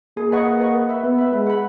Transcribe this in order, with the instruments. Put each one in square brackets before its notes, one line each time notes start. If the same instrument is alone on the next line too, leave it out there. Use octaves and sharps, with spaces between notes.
[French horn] A#3 [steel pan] G#4
[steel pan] B4 D#5 F#5 C#6
G#4
B4 D#5 F#5 C#6
B4
E5 B5
[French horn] B3 [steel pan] B4
[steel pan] E5 B5
[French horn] G#3 [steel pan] B4
[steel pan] F#5 B5